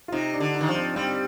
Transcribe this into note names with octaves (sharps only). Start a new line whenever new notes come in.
F4
C3 D#4
D4
D3
D#4
D#3
F3
C4
G3 C4